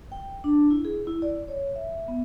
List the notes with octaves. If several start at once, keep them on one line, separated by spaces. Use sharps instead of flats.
G5
D4
E4
G#4
E4
D5
C#5
E5
B3